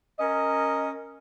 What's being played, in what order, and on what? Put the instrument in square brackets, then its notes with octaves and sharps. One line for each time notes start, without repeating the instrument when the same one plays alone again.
[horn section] C#4 A#4 D#5